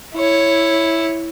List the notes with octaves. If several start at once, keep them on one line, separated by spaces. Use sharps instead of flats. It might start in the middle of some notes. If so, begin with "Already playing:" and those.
E4 C#5